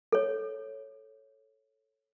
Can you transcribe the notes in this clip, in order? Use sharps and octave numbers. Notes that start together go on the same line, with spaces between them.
A4 C#5